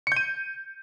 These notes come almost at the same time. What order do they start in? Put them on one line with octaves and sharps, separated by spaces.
C#7 G6 D#7